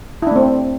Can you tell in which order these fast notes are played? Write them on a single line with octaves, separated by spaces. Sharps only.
E4 D4 A3 C4